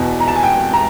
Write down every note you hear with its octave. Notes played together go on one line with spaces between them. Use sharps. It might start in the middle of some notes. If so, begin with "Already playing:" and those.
Already playing: E2 B2
A#5
A5
G#5
G5
A#5